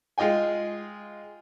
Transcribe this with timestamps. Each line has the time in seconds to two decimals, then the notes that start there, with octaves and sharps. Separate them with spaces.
0.18 G#3 F4 D#5 G5 G#5